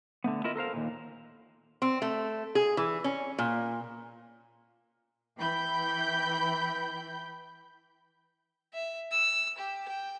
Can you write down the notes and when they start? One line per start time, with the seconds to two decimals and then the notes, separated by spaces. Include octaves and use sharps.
0.24 D3 A3 B3
0.44 E4 F4 A#4 D#5
0.56 A4 A#4 C5 F5
0.73 D#2 A#2
1.82 C4
2.02 A3
2.55 G#4
2.77 E3
3.04 C#4
3.38 A#2
5.38 E3 G5 B5 G6
8.73 E5
9.11 E6
9.58 G4
9.88 G5